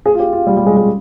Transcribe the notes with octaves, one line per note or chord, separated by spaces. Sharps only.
G#4
F4
G4
F4
G3
G3
G#3
G#3